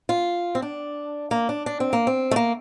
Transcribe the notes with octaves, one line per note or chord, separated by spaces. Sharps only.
F4
C4
D4
A#3
D4
D4
C4
A#3
C4
A3
A#3